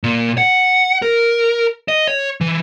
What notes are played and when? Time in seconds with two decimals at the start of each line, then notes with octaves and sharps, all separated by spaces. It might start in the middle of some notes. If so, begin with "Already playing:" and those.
0.04 A#2
0.38 F#5
1.02 A#4
1.88 D#5
2.08 C#5
2.41 E3